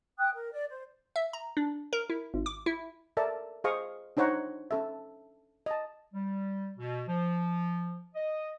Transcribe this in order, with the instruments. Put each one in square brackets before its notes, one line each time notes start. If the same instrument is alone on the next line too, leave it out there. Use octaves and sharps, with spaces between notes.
[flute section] G5 D#6 F#6
A#4
D5
C5
[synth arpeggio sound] E5
A#5
D4
A#4
E4
G#1
D6
E4
[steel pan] A4 A#4 D5 E5 A5
G#4 C5 D#5 F5 C#6 D#6
D4 D#4 C5 C#5 F#5 A#5
C#4 A4 E5
D#5 A5
[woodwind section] G3
B2
F3
D#5